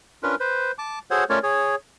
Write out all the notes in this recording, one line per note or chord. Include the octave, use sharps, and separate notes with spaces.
C#4 D4 F4 A#4 B4
B4 C5
A5 D6
F#4 G#4 A4 C5 C#5 F#5
A3 C#4 F4 A#4 C#5 D5
G#4 C#5